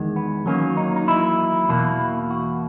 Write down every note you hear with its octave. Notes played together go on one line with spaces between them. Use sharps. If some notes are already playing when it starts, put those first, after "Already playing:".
Already playing: E2 D#3 G#3
B3
E2 D#3 F#3 A#3 C#4
D#4
D#4
E4
E2 B2 A#3
F#4